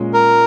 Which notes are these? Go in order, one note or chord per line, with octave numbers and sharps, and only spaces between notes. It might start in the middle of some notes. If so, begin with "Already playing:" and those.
Already playing: A#2 G#3 C#4
A#4